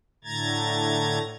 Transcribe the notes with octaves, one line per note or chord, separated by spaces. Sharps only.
A2 D3 A3 A#5 G#6 A6